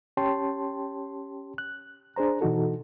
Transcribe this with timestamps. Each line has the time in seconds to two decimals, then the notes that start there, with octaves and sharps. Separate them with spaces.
0.17 C#4 G4 C#5 G5 A5 C6
1.58 F#6
2.16 D4 G#4 C5 A#5
2.41 B2 E3 D#4 F#4 A4